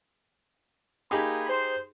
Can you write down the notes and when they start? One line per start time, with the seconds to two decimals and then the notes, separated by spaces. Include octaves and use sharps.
1.11 A#3 D#4 G4 G#4 G#5 B5
1.48 C5